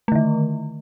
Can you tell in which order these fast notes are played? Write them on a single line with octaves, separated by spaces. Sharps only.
A3 D3 D#3